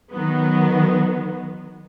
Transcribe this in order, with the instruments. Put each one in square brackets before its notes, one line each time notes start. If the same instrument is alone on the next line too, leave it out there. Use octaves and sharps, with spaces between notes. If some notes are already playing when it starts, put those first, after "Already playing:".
[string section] D#3 F#3 B3